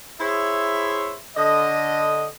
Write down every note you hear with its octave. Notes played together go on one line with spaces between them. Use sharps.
E4 G#4 C5 C#5 E5
D3 D#5